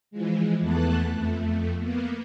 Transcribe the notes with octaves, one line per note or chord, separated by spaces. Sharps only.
E3 F3 G#3
E2 E3 A3 B3 A5 F#6
F2 A3
A#3 B3